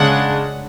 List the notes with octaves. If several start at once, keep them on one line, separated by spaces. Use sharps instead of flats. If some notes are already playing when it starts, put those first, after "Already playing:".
Already playing: C#3 G#3 D4 F#5